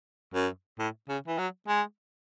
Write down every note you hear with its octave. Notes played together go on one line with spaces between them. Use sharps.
F#2
A2
C#3
E3
F#3
G#3